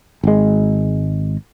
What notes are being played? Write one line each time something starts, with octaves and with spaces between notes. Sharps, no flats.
G#1 G#3